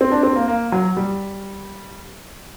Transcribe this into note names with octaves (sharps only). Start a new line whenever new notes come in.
C4
D4
C4
A#3
A#3
F#3
G3